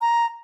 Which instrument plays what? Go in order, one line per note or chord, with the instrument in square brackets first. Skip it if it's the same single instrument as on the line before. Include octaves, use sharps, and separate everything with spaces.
[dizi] A#5